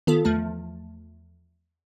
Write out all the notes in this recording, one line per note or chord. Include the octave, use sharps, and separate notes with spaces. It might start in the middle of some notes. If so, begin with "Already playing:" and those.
D#3 B3 F4 A4
E2 F3 A3 A5